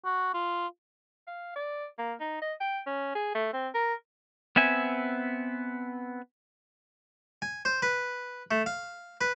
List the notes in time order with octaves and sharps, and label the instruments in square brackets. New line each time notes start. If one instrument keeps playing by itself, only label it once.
[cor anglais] F#4
F4
[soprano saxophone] F5
D5
A#3
D#4
D#5
G5
C#4
G#4
A3
C4
A#4
[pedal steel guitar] B3 C4 E5 G#5
[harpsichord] G#5
C5
B4
A3
F5
B4